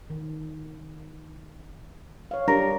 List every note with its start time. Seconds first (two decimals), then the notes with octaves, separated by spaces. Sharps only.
0.10 D#3
2.31 C#5 F5
2.48 G3 D4 G4 A#4